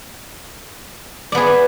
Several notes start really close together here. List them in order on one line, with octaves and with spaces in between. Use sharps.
D5 B3 G#4